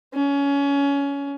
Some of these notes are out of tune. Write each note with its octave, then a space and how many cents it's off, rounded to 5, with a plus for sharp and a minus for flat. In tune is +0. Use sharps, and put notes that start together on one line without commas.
C#4 +20